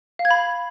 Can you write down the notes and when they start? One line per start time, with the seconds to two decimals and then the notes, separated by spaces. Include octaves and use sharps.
0.19 F5
0.25 G#6
0.31 B5